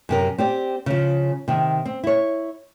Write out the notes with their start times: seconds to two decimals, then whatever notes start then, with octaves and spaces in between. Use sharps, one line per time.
0.09 F#2 C3 A#4
0.38 C4 G4 D5
0.86 C#3 F3
1.48 C3 D#3
1.85 C4
2.04 E4 C#5